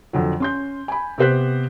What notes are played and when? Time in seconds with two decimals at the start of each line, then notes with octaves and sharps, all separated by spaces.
0.13 F2 D3 F#3
0.40 C#4 C6 G6
0.88 G#5 B5
1.18 C3 B3 G4 C5 F#6 B6